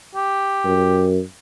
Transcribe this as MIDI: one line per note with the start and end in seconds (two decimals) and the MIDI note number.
0.15 1.07 67
0.65 1.20 42